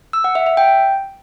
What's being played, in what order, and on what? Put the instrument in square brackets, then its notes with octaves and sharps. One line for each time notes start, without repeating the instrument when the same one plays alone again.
[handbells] E6
F#5
E5
E5
G5